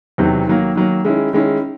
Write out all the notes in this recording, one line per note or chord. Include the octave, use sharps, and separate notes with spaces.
E2 C3 D#3 F#3
D#3 F#3 A#3
D#3 F#3 A#3
D#3 G#3 C#4 E4
D#3 G#3 C#4 E4